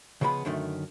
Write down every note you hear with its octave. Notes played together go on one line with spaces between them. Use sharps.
C#3 F3 G#3 B3 B5
F#2 D3 D#3 A3